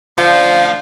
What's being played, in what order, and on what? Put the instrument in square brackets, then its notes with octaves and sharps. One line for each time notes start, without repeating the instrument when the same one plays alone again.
[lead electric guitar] D2 F5 [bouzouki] D3 [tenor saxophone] F3